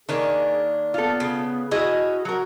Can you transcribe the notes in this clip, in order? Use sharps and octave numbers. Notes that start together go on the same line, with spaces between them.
D#3 A#3 D4 G#4 C#5
B3 F4 A4
C#3
C#4 E4 F#4 G#4 D#5
F#3 F#4 A#4